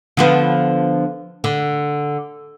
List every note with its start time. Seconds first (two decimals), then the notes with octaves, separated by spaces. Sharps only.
0.17 D3 F3 B3
1.44 D3